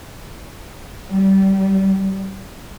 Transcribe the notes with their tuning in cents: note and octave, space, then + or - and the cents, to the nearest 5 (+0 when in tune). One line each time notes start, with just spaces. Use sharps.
G3 -25